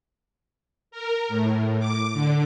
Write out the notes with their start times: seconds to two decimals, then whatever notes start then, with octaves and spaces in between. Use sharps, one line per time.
0.91 A#4
1.29 A2
1.79 D6
2.13 D3